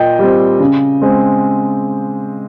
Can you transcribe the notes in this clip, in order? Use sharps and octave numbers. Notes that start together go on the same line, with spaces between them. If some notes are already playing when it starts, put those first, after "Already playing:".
Already playing: A#2 D#5 G5
G3 C4
C#3
G#3 C4